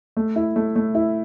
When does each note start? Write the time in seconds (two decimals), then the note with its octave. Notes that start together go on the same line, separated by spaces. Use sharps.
0.17 A3
0.36 E4
0.56 A3
0.76 A3
0.95 E4